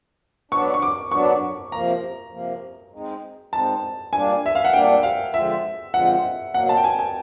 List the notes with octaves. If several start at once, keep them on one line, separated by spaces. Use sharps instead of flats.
F#3 B3 D4 C#6
C#6
D6
F#3 B3 D4 C#6
C3 F3 A#3 A#5
C3 F3 A#3
G#3 C4 D#4
G#3 C4 D#4 A5
A#2 G3 A#3 D4 G#5
E5
F5
F#5
A#2 G3 A#3 D4 G5
F5
D3 F3 G#3 C4 F4 E5
D3 F3 G#3 C4 F4 F#5
B2 F#3 A#3 F#5
A5
G5
G#5
G#5